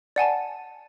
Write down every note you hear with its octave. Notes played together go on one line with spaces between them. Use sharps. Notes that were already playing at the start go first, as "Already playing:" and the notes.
D5 F#5 G#5 A5